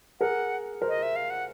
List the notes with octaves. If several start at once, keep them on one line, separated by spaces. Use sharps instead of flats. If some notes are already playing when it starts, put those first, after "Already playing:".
G#4 A#4 F#5
A#4 C5
D#5
E5
F5
F#5